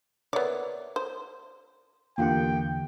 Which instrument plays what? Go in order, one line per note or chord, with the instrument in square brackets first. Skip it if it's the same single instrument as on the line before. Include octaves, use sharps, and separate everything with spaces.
[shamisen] B3 D5 [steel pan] A#4 C#5 E5
[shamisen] C5
[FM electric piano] E2 D3 G4 [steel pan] A#3 F4 F#5 [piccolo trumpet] G5